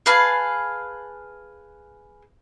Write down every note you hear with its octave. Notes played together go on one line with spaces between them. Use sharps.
G#4 B4 F5 A5